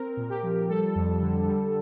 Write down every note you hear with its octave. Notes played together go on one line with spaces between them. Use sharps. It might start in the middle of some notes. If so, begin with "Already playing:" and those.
Already playing: C4 A#4
A#2
G4
F3
G3 A4
F2
D3
G3